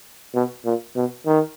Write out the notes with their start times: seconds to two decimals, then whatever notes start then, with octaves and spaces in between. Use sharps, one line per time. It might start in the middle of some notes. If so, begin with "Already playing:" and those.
0.34 B2
0.65 A#2
0.96 B2
1.26 D#3